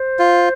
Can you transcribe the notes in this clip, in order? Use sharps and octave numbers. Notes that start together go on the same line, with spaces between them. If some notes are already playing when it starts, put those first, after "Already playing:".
Already playing: C5
F4